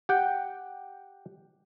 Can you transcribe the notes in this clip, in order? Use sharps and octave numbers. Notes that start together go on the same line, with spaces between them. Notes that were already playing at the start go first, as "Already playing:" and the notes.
G4 F#5 G5